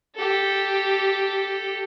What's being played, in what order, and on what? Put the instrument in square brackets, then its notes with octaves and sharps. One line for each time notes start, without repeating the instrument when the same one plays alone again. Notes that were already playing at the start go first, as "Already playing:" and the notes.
[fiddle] G4 A4